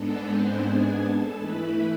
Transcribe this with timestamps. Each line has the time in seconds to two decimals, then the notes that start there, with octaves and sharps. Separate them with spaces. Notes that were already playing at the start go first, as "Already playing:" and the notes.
Already playing: G#2 G#3 B3 D4 A4
0.25 C4 C5
0.62 G#4 G#5
0.99 A4 A5
1.36 E3 A3 E4 B4 B5